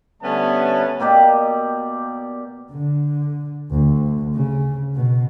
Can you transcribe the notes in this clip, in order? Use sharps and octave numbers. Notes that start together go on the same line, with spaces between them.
D3 G3 A3 B3 C#4 A5
B2 A#3 G4 D5
D3
D2
C#3
B2